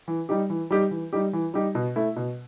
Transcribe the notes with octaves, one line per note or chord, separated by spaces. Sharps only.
E3
G3 D#4 G4
E3
G3 D#4 G4
E3
G3 D#4 G4
E3
G3 D#4 G4
B2
A3 E4
B2